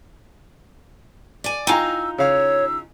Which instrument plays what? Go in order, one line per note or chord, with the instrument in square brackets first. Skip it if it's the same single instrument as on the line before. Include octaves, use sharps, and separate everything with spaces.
[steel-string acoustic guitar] D5 G#5
[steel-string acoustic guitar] D#4 F4 [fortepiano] G5 G#5 A#5 [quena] E6
[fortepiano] C#3 F5 [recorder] C#5 [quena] E6